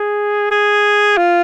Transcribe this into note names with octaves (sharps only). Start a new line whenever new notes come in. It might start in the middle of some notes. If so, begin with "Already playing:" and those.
Already playing: G#4
G#4
F4